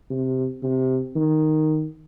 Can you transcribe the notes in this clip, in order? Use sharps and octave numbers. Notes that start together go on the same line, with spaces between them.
C3
C3
D#3